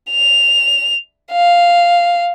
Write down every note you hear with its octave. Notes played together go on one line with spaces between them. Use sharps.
F7
F5